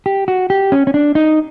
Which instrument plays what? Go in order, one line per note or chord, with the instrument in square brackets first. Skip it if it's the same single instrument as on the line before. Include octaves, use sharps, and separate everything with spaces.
[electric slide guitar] G4
F#4
G4
C#4
C#4
D4
D#4